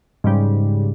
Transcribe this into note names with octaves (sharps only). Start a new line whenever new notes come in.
G#2 C#3 G3